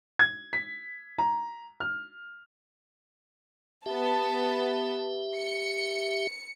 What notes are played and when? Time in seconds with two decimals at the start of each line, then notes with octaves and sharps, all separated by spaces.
0.19 G#6
0.53 B6
1.18 A#5
1.80 F6
3.86 B3 G4 E5 A5
5.36 C#7